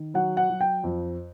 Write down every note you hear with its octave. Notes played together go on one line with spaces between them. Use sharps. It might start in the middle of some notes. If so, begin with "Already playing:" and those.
Already playing: D#3
F#3 F#5
F#5
F#3
G5
F2